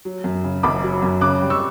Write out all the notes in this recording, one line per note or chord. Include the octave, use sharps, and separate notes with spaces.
F#3
F#2
C#3
F#1 B5 D6
F#3
F#2
C#3 D6 F#6
G3
C#6 E6